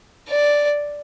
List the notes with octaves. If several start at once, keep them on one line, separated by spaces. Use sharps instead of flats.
D5